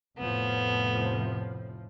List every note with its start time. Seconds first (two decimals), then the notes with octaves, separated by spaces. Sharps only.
0.18 F1 A2 F3 B3